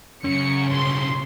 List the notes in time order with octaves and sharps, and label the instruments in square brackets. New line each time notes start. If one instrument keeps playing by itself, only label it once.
[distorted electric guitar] F#2 [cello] C#3 [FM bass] C#4 [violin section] C#7
[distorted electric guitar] G2 B2 [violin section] C6